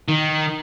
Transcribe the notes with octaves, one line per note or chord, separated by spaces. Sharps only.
D#3